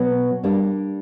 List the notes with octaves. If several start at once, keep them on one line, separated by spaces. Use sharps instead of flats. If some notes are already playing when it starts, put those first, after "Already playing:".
Already playing: B2 F#3 B3
G3 A#3 D4